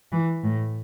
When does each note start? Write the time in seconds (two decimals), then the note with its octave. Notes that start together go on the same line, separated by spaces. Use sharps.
0.12 E3
0.44 A2